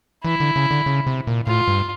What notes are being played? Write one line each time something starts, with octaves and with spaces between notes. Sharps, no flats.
E3 E4
D3
C#3
D3
C#3
C3
A#2
A2 F4
G2